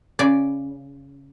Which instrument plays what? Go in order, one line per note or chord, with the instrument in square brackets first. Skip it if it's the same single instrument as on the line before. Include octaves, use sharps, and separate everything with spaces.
[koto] C#3 D5